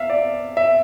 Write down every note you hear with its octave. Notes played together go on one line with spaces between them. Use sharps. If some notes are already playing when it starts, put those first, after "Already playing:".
Already playing: E2 E5 F5
D5
E5